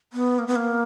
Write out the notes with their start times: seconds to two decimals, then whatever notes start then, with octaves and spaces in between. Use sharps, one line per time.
0.13 B3
0.39 A#3
0.47 B3
0.56 A#3